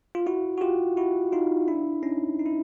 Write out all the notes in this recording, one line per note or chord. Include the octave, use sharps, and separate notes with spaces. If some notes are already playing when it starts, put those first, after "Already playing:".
F4
E4 F#4
F#4
F4 G4
E4 F#4
D#4 F4
D4 E4
C#4 D#4
D#4
E4